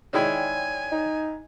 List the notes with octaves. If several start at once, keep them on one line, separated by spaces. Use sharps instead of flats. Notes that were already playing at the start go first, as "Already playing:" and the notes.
D#3 G#3 E4 C#5 D5 G5 G#5
D#4